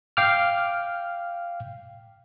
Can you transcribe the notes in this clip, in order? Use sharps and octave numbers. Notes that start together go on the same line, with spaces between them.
F5 G5 D6 F6